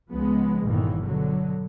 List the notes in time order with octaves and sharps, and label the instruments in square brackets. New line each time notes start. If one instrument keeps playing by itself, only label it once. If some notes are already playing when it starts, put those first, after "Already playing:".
[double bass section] C#2 F3 G#3 B3
G1 E2 A#2 D#3 E3
B2 D3 F#3